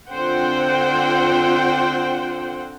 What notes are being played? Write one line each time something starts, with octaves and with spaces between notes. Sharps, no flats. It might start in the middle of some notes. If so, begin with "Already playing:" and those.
D3 C4 F4 C5 F#5 G5